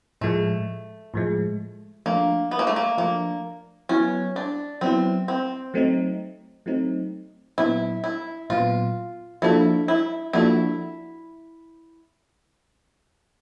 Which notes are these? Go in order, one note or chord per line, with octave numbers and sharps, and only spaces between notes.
A2 F3 G#3 A3
A2 F3 G#3
F3 A3 A#3 D4
B3
A#3
A3
A#3
F3 A3 A#3 D4
F#3 B3 C#4 E4
D4
F#3 B3 C4 E4
C4
F#3 A3 C4 D#4
F#3 A3 C4 D#4
A#2 F#3 B3 E4
E4
A#2 F#3 B3 F4
F3 A#3 D4 E4 F#4 A4
E4
F3 A#3 D4 E4 F#4 A4